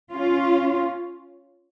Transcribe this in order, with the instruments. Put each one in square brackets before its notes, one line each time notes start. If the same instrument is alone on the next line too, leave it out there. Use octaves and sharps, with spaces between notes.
[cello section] C#4 F4